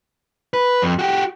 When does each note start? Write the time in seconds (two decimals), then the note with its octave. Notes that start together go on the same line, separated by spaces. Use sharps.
0.54 B4
0.82 F2
0.99 F#4 G4